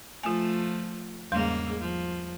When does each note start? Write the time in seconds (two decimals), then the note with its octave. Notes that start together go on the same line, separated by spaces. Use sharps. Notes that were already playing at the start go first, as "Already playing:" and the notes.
0.23 F3 A3 F4 G#5
1.32 E2 G#2 C#3 G3 A#3 C6
1.79 F3